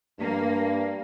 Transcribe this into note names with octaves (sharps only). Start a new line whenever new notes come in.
G2 A#3